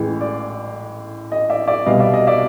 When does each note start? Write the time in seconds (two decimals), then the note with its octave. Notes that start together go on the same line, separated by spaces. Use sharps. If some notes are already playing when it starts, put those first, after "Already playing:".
Already playing: A1 A2 E3 G#3
0.21 D5
1.32 D#5
1.50 D5 E5
1.67 D5 E5
1.86 C2 B2 G3 D#5 F5
2.00 D5 E5
2.13 D#5
2.27 D5 E5